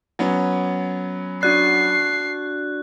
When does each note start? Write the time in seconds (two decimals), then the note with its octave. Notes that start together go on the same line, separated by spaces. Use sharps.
0.19 F#3 B3 C#4
1.43 D4 F#4 D5 F#6 C7